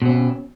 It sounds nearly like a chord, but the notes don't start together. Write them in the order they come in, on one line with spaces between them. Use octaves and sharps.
B2 C4 C#4